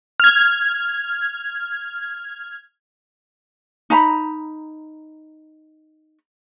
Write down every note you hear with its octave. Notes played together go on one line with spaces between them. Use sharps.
F6 G#6
D#4 A#5 B5